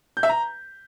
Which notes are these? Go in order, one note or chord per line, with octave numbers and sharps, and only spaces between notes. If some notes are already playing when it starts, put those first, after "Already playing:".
G6
E5
A#5